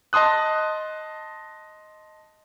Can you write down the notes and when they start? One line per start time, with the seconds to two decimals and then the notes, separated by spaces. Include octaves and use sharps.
0.13 D#5 A5 C6 D#6 F#6